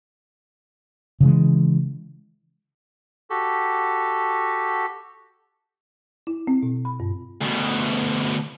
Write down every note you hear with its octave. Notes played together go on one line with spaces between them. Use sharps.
C#3 E3 G#3
F#4 G4 A4
E4
C4
B2
B5
G2
D2 B2